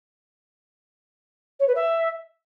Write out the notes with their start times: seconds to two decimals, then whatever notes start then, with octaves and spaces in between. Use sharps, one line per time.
1.59 C#5
1.67 B4
1.75 E5